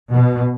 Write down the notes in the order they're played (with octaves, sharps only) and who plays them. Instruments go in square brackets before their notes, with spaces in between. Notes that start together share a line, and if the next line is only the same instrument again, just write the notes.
[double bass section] B2